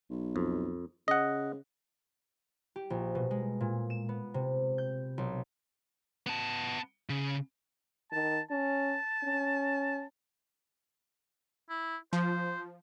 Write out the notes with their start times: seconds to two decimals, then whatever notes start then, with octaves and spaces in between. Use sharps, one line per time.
0.10 B1
0.36 F2
1.08 C#3 D#5 F#5
2.76 G4
2.90 A#1
3.15 B2
3.31 G#3
3.61 A#2
3.90 E7
4.09 B3
4.34 C3
4.78 G6
5.18 B1
6.27 B3 A5
7.09 C#3
8.12 D#3 A5
8.51 C#4 A5
9.24 C#4
11.70 E4
12.13 F3 C5